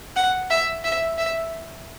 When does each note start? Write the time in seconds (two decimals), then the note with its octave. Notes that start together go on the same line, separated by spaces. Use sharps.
0.16 F#5
0.50 E5
0.84 E5
1.18 E5